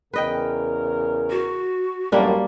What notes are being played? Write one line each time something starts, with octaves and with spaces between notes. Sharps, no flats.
E2 C#3 A#4 B4 D#5 G5
F#4
A1 F#2 G3 A#3 D4